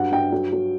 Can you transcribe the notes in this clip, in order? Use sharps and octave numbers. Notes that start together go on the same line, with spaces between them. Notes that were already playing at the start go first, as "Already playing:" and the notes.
Already playing: G2 F#3 F#5
G2 G5
F#3
F#3